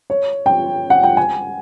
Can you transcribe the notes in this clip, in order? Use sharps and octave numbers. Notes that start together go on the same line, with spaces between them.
C#5
G5
F#5
G5
G#5